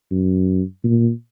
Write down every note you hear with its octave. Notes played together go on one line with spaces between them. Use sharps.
F#2
A#2